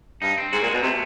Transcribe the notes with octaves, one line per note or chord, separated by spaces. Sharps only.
G2 D#4
C4
G#2 F#4
A#2
G#3
B2
C3 A3